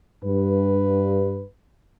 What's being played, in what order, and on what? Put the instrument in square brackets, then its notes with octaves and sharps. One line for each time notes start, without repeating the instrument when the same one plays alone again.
[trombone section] G2 [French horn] B4